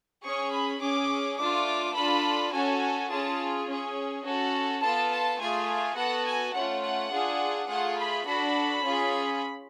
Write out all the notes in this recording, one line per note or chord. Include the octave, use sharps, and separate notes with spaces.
C#4 G#4 C#6
B5
C#4 G#4 D6
A3 D4 F4 D6
D4 F4 A4 B5
C#4 F#4 A4 G#5
C#4 F4 G#4 A5
C#4 G#4
C#4 F#4 A4
B3 F4 A4 A5
A5
A3 F4 G#4 G#5
B3 F#4 A4 F#5
G#5
A3 C#4 F4 F#5
F#5
D4 F4 G#4
A3 F4 G#4 F#5
B5
D4 F#4 A4 B5
C#4 F4 G#4